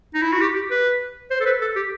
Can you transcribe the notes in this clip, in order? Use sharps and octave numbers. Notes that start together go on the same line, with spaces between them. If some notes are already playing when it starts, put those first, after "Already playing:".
D#4
E4
F#4
G4
G4
B4
C5
A4
B4
A4
G4